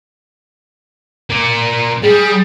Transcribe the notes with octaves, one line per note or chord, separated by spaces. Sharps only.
A#3 D5
G3 G#4